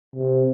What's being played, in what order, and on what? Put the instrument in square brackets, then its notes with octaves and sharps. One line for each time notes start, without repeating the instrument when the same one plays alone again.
[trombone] C3